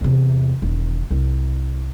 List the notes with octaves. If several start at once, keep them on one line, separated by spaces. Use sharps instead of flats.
E2 C3
E1 D#3
C2